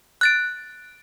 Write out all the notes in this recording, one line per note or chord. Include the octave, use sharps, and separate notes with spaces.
F#6 A6 D7